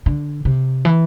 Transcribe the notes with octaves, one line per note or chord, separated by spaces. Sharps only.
D3
C3
E3